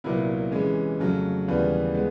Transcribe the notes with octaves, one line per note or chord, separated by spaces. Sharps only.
C2 A#2 F#3 B3 E4
C3 E3 G#3 C#4
F2 C#3 F#3 A3
D#2 C#3 E3 G3 B3
G#3 B3